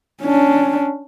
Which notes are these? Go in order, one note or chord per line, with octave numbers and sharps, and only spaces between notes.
C#4 D4